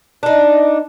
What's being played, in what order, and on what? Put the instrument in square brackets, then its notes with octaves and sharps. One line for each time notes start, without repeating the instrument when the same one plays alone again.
[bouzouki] D4 D#4